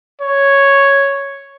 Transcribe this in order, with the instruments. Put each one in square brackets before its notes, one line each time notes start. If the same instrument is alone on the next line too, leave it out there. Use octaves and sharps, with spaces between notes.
[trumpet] C#5